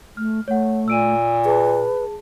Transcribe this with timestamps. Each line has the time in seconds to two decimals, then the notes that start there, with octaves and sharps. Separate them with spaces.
0.17 A3 F6
0.48 A3 C#5 F#5
0.88 A#2 E6 D7 D#7
1.45 G#4 B4 A5